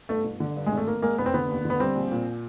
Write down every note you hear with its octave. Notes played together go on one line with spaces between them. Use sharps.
G1 A3
G1
D3
G2
G#3
G#1
A3
G#1 A#3
G#3 A#3
F1 B3
C4
D3 B3
D#2
D3 B3
G3 C4
A#1
A#2